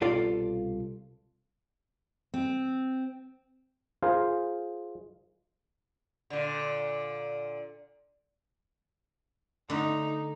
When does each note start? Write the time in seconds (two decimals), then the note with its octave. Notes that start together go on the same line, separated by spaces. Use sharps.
0.01 C2 B2 F4 A4 D5 F5
2.34 C4
4.02 F4 G#4 A#4 C5 F5
6.30 A#2 D3
9.70 D3 A3 D#4